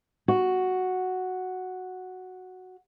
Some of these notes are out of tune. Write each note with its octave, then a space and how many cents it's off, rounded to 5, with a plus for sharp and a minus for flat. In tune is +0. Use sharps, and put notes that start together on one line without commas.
F#4 +0